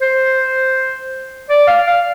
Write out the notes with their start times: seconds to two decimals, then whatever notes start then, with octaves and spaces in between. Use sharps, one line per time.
0.01 C5
1.50 D5
1.68 F5
1.87 F5